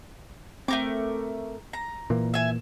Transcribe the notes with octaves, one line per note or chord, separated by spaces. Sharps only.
A3 C4 A#4 D6
A#5
A#2 E3 A#3
E5 G#5